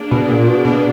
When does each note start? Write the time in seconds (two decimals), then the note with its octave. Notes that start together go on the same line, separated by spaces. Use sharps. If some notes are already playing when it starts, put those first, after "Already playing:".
Already playing: A#3 D4 G#4 D5
0.11 B2
0.30 A#2
0.48 B2
0.65 B2